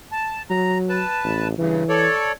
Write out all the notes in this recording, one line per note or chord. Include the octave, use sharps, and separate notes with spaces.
A5
F#3 A#5
B4 A5
A1
G2 C#3 E3
A4 C#5 D5